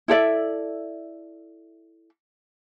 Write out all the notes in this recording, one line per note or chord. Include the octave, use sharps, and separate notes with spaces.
E4 A4 D5 E5